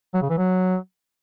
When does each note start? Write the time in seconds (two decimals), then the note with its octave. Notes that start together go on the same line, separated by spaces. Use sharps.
0.14 F#3
0.22 C#3
0.30 E3
0.38 F#3